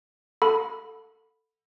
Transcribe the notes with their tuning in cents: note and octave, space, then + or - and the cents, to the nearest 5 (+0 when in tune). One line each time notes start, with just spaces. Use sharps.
A4 +15 F#5 -45 B5 +0